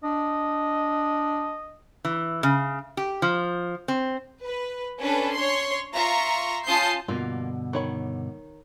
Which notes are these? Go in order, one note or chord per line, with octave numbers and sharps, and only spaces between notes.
D4 D#5
E3
C#3
G4
F3
C4
B4
C#4 D4 A4 B4
C#5 C6
F4 E5 A#5 C6 C#6
C#4 F4 A5 D#6 G6 C7
G2 B2 D3 A#3 F4
D#3 C#5 B5